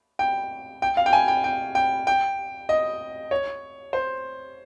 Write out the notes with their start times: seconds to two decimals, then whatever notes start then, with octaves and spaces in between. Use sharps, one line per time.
0.19 G5
0.82 G5
0.97 F5
1.06 G5
1.13 G#5
1.28 G5
1.44 G5
1.75 G5
2.07 G5
2.69 D#5
3.31 C#5
3.93 C5